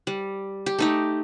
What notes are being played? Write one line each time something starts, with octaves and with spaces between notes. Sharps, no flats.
G3
G4
A3 D#4 G4